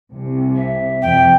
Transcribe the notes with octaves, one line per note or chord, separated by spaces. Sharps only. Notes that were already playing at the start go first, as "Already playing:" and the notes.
C2 C3
E5
F2 C3 G5